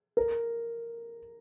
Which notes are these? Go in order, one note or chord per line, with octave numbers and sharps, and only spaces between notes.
A#4